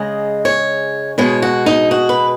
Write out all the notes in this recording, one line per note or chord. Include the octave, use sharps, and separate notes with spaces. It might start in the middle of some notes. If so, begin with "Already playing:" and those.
Already playing: C#3 G#3 D#5
C#5
B2 G#3 C#5
F#4
D#4
F#4
B4